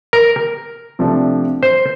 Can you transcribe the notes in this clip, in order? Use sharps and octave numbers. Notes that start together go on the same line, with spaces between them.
A#4
C3 F3 A3 D4
C5